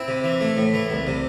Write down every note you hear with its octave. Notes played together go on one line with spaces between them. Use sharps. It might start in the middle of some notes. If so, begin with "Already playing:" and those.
Already playing: C4 E4
C3
E3
A3
A2
E3
C2
C3